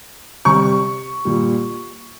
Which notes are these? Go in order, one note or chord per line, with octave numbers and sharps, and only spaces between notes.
C3 G3 C#6
A#2 G3